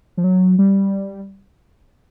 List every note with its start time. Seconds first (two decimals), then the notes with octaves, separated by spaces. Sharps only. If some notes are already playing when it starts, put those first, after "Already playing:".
0.17 F3
0.24 F#3
0.58 G3